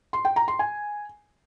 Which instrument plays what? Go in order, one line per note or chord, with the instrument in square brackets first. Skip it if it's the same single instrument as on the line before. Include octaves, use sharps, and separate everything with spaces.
[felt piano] C6
G5
A#5
C6
G#5